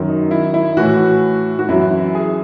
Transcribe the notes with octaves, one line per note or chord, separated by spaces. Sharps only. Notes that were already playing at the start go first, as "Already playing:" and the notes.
Already playing: F#2 D#3
D#4
E4
E4
A2 E3 F#4
F#4
F#2 E3 E4
G#4